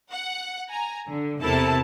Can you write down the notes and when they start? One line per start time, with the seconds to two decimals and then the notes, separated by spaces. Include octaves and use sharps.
0.11 F#5
0.70 G#5 A#5
1.09 D3
1.42 E2 C3 E4 A4 A#4 A5